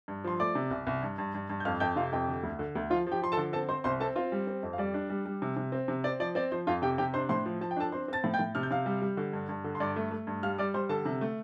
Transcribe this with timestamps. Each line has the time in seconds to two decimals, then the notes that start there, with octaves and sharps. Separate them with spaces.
0.08 G2
0.24 F3 C6
0.40 A3 D5 D6
0.55 C3
0.71 C2
0.87 C2
1.03 G2
1.18 G2
1.34 G2
1.50 G2
1.60 G6
1.65 F2 F5 F6
1.80 F2 G5 G6
1.96 C3 F4 F5
2.12 F2 G4 G5
2.28 D3
2.43 D2
2.59 D3
2.75 D2
2.90 F3 F4 F5
3.07 F3
3.12 G4 G5
3.22 F3 C6
3.32 A4 A5
3.37 D3
3.53 C4 A4 A5
3.69 C4 C5 C6
3.84 C2 C5 C6
4.00 C4 A4 A5
4.16 C4 F4 F5
4.32 G3
4.47 C4
4.63 F2
4.73 F5
4.78 G3 D5
4.94 D4
5.10 G3
5.26 G3
5.42 C3
5.57 C3
5.72 C4
5.88 C3
6.04 C4 D5
6.20 F3 D5
6.35 C4 D5
6.52 F3 C5
6.67 F2 F4 F5
6.82 C3 G4 G5
6.98 C3 G4 G5
7.14 D4 C5 C6
7.29 A2 C5 C6
7.46 F3
7.61 F3 A5
7.71 G5
7.76 D4 A4 A5
7.92 C4 C5 C6
8.08 C4 A5 A6
8.24 A2
8.34 G5 G6
8.39 A2
8.55 C3 F6
8.63 G6
8.71 C3 F5 F6
8.86 G3
9.02 G3
9.17 D3
9.33 G2
9.49 G2
9.64 D3
9.75 C6
9.80 G2 D5 D6
9.96 A3
10.11 A3
10.27 G2
10.43 G3 F5 F6
10.58 G3 D5 D6
10.74 G3 C5 C6
10.89 D3 A4 A5
11.05 C3
11.21 A3